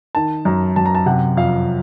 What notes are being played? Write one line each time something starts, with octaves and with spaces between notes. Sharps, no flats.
D#3 A5
F#2 A#5
F#2 A5
A#5
A5
C3 F#5
F2 F5